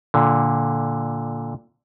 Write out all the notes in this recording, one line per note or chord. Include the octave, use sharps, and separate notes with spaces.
A#2 D3